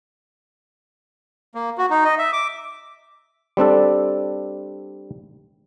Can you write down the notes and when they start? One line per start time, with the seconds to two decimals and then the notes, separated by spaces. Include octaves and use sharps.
1.55 A#3
1.78 F#4
1.90 D#4
2.04 D#5
2.18 E5
2.33 D6
3.57 G3 C4 D4 A4